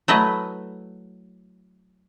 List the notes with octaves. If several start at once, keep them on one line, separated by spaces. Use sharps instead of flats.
F#3 A3 E4 B4 D#5